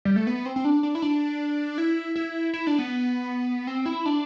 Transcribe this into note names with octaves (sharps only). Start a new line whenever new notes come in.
G3
A3
B3
C4
C4
D4
D4
E4
D4
E4
E4
E4
D4
B3
C4
E4
D4